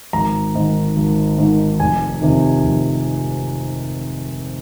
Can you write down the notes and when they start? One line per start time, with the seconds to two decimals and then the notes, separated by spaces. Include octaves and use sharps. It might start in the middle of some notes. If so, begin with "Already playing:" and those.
0.13 G#1 A#5
0.55 G#2 D#3
0.96 G#1
1.38 G#2 D#3
1.80 F1 G#5
2.21 F2 C3 D#3
2.64 F1